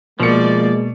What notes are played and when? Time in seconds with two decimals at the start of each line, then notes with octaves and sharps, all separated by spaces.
0.20 B2 F3 G#3 A#3 D5 C#7